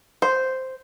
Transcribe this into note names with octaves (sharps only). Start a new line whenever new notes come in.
C5